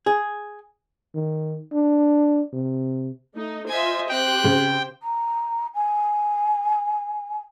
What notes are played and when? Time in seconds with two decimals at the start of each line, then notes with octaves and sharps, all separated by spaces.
0.06 G#4
1.15 D#3
1.72 D4
2.53 C3
3.35 A3 D#4
3.68 F4 C5 D#5 E5 G#5
4.09 C4 G4 C5 G5 F#6
4.44 C#3
5.03 A#5
5.75 G#5